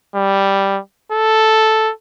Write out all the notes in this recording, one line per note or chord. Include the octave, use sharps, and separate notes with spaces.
G3
A4